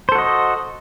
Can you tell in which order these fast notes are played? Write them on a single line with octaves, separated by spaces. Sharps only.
C5 A4 F#4 D#5